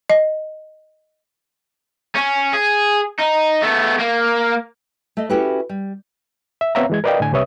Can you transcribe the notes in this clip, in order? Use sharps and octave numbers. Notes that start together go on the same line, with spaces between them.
D#5
C#4
G#4
D#4
A3 B3
A#3
A3 D#5
C#4 E4 F#4 G4 A4 B4
G3
E5
B3 C4 C#5 E5 F5 A#5
E3 G#3 G#6
A#4 B4 D5 D#5 F5 G5
A2 D3 G#5
C2 C3 B4 C#5 E5 D#6